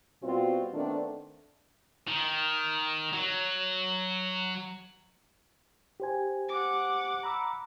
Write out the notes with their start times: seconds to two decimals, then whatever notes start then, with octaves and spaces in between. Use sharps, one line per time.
0.23 B2 G3 C4 F4 F#4
0.73 D#3 A3 B3 C4 D4
2.07 D#3
3.13 F#3
6.00 G4 C5 G#5
6.49 F#5 D6
7.23 A#5 B5 E6